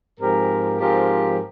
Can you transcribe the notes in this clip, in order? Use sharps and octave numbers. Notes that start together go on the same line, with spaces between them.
G#2 F3 C4 G4 A#4
G#2 F3 C4 G4 A#4